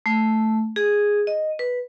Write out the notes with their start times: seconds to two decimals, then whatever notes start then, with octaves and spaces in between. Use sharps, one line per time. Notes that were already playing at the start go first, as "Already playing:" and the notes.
0.06 A3
0.76 G#4
1.27 D#5
1.59 B4